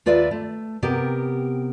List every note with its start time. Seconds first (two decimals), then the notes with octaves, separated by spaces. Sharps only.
0.06 D#2 F4 B4 D5 E5
0.31 A3
0.82 C3 B3 G4 A#4